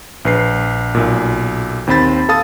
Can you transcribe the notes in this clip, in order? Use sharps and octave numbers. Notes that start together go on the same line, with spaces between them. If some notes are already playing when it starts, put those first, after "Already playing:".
A#1 B4 C7
B1 A#2
D#2 C4 C5 B5 A6
A4 F5 A5 D#6 A6